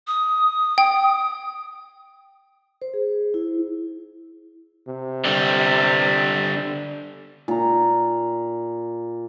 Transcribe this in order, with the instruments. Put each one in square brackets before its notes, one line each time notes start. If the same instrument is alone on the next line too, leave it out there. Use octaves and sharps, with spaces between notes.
[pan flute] D#6
[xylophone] G5
[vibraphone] C5
G#4
E4
[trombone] C3
[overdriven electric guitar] D3 G3
[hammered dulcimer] A#2 A#5